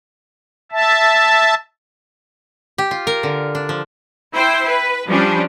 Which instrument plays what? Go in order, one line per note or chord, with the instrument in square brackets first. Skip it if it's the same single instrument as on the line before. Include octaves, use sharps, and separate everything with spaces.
[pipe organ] E5 A5
[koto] G4
F4
A#4
D3
D4
F3
[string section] E4 C5 G5 C7
B4
F3 G3 C#4 D4